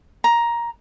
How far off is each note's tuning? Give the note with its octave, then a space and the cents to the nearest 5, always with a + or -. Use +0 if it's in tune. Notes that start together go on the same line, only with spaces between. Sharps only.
A#5 +10